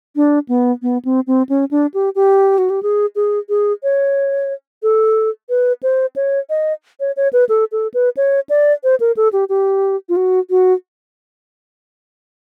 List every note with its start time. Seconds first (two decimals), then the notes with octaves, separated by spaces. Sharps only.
0.16 D4
0.49 B3
0.82 B3
1.05 C4
1.27 C4
1.49 C#4
1.71 D4
1.94 G4
2.15 G4
2.58 F#4
2.70 G4
2.83 G#4
3.15 G#4
3.49 G#4
3.83 C#5
4.83 A4
5.49 B4
5.83 C5
6.16 C#5
6.50 D#5
7.00 C#5
7.17 C#5
7.33 B4
7.49 A4
7.72 A4
7.94 B4
8.17 C#5
8.49 D5
8.84 C5
9.00 A#4
9.17 A4
9.33 G4
9.49 G4
10.09 F4
10.16 F#4
10.50 F#4